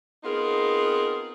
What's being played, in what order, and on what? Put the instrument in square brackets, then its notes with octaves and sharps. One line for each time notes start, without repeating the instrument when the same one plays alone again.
[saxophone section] B3 C4 D#4 F4 G#4 A#4